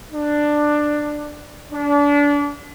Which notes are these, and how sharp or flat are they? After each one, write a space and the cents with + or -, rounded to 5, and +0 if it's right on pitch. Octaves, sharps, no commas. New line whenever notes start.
D4 +10
D4 -30